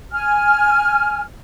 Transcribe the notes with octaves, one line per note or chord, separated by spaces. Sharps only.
G#5 F6